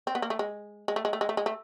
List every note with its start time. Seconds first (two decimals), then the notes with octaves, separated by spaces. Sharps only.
0.07 C4
0.15 B3
0.22 A#3
0.30 A3
0.39 G#3
0.88 G#3
0.96 A3
1.05 G#3
1.13 A3
1.21 G#3
1.29 A3
1.37 G#3
1.46 A3